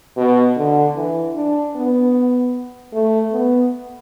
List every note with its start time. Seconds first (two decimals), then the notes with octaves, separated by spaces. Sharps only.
0.17 B2
0.57 D3
0.96 E3
1.36 D4
1.76 B3
2.93 A3
3.32 B3